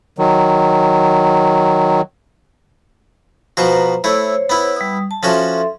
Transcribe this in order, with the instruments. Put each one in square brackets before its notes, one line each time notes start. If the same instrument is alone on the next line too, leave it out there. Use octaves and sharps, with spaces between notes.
[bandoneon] D#3 F#3
[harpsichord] B2 F3 F#4 [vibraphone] B4 C5 A#5
[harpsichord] A3 E4 [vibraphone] C5 C#5
[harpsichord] B3 E4
[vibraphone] G3 D#6
A5
[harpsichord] F3 C#4 F#4 [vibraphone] A4 E5 C6